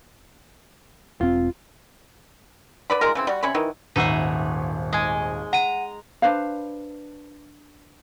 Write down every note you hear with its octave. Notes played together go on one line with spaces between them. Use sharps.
E1 C4 F4
D3 B4 D5 B5
D#3 G#3 F4 A#4
C#3 E3 C4
G3 F#4
C3 C#4 C#5 B5
D#3 E3
D#1 G#1 D#4 G#4 B4 E5 F#5
G#3 D#5 G#5
F#5 A#5 D#7
D4 B4 C5 F5